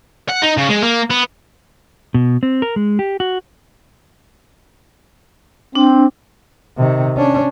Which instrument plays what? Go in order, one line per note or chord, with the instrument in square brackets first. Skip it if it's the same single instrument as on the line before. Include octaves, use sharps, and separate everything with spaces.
[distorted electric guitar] F#5
D#4
C#3
G#3
A#3
B3
[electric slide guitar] B2
C4
A#4
G#3
G4
F#4
[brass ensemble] C4 [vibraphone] D4
[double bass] C3 D#3
C#4 D4